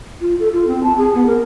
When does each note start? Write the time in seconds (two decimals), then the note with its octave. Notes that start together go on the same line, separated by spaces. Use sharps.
0.21 F4
0.40 A4
0.52 F4
0.67 C4
0.84 A5
0.97 G#4
1.14 B3
1.27 A#4